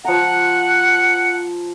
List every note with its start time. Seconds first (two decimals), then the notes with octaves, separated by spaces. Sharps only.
0.05 F3 F#5 A#5